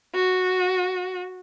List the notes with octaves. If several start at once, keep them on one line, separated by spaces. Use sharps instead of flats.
F#4